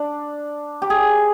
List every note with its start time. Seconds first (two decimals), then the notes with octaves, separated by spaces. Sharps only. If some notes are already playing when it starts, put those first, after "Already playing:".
Already playing: D4
0.82 G4
0.90 G#4